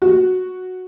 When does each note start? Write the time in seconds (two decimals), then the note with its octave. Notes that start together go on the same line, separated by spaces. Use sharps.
0.02 F#4